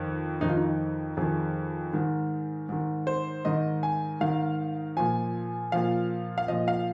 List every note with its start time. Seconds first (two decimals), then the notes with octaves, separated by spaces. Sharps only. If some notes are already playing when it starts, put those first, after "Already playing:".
Already playing: F2 D#3
0.41 F2 D#3 D#4
0.49 F4
0.57 D#4
1.17 F2 D#3 G#4
1.93 G#2 D#3
2.69 G#2 D#3
3.07 C5
3.45 G#2 D#3 D#5
3.83 G#5
4.20 G#2 D#3 F5
4.97 A#2 F3 G#5
5.72 A#2 F3 F5
6.38 F5
6.48 A#2 F3 D#5
6.68 F5